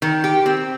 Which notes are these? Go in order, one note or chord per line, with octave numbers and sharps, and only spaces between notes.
D#3
G4
C4